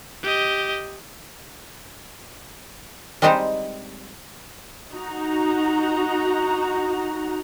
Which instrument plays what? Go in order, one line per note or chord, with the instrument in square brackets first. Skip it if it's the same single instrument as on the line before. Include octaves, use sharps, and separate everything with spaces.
[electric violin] G4 D#5
[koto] G3 G#3 C4 D#4 G4 C5
[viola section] D#4 F#4 A#5